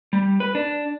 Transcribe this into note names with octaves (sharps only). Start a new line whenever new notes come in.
G3
B4
D4